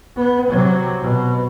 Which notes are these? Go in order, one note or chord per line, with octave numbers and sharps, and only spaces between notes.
B3
C3 F#3
B2